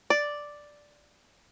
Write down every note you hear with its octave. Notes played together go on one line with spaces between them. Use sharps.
D5